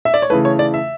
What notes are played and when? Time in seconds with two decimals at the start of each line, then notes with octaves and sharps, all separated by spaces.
0.05 E5
0.14 D5
0.22 C#5
0.30 C#3 E3 A3 B4
0.45 C#5
0.59 D5
0.74 E5